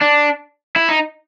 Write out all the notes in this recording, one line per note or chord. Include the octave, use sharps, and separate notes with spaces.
D4
E4
D#4